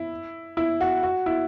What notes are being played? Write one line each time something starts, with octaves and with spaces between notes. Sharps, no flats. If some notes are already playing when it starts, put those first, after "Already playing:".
Already playing: E4
E4
F#4
F#4
E4